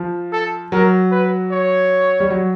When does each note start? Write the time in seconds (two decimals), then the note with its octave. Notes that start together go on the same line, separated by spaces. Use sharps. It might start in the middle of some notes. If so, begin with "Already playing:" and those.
Already playing: F3
0.32 A4
0.72 F#3 A#4
1.11 B4
1.51 C#5
2.20 G3
2.30 F#3